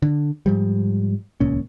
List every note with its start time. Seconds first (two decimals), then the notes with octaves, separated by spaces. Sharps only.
0.02 D3
0.46 G#2 F3 G3
1.40 D#1 C#2 A#2 C#4